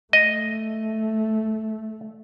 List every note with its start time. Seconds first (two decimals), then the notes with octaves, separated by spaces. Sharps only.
0.13 A3 D#5